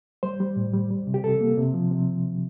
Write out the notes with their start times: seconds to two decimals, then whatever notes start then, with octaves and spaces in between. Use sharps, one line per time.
0.23 G3 C5
0.40 G3
0.57 A2
0.73 G3
0.90 G3
1.07 C3
1.14 G4
1.24 C3 A4
1.41 A#3
1.58 C3
1.74 F3
1.91 C3